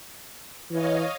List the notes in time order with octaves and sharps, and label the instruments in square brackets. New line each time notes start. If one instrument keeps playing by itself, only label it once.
[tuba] E3 [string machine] C#5 D#5 F5